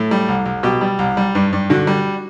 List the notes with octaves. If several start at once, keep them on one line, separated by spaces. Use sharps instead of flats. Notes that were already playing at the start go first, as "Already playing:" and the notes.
Already playing: A2 A4
G3
C2
C2
B2 G4
G3
C2
G3
G2
G2
D3 F#4
G3